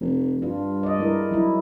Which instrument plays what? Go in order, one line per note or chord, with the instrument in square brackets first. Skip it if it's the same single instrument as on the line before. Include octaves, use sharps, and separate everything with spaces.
[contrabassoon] F1
[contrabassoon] G2 [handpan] G3 D4 F4
[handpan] D5 D#5
G#3 E4 A#4
F#3 D#4 E4